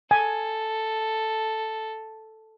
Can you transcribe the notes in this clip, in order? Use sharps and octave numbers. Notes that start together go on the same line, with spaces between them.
A4 G#5